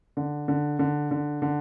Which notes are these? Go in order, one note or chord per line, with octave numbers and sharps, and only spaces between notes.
D3
D3
D3
D3
D3